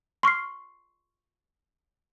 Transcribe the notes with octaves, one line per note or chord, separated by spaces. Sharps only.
C6 C#6 F6 C7